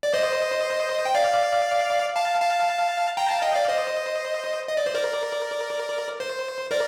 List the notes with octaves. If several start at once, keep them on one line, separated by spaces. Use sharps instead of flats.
D5
C5 D#5
G5
D5 F5
F5 A5
F5 A5
G5 A#5
F5 A5
D#5 G5
D5 F5
C5 D#5
D#5
D5
C5
A#4 D5
C5
A#4 D5